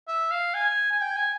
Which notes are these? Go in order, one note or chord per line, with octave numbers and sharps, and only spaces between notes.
E5
F5
G#5
G#5
G5
G#5